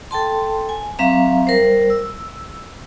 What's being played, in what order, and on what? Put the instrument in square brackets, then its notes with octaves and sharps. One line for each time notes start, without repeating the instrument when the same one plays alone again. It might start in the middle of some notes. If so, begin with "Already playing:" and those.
[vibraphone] A4 G5 A5 C6
G#5
F#3 C4 E5 F5 A#5
G3 A#4 C5
E6